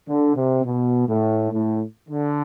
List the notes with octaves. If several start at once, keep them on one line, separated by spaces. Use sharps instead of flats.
D3
C3
B2
A2
A2
D3